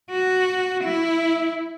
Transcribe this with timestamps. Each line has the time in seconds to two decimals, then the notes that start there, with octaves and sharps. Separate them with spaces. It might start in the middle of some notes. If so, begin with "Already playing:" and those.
0.11 F#4
0.84 E4